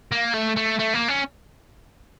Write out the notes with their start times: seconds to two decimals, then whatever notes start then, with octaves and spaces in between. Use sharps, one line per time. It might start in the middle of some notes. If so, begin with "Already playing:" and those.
0.12 A#3
0.34 A3
0.56 A3
0.79 A3
0.94 A#3
1.08 C#4